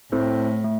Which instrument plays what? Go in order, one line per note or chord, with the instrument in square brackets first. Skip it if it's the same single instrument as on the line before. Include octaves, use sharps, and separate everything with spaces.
[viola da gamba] A2 [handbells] A3 C4 E4 A4 C5
[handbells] A3